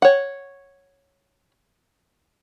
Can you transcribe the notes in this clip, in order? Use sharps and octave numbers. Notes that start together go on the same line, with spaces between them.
C#5 F#5